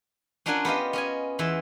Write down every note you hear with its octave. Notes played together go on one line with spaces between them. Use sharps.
C#4 D4 F4 A#4 F#5 G#5
B3 G4 D#5 F5
C#4 D#5 G#5
E2 E3 F4 E5